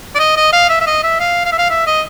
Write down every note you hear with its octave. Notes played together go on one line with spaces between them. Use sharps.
D5
D#5
D#5
F5
E5
E5
D#5
E5
F5
F5
E5
F5
E5
D#5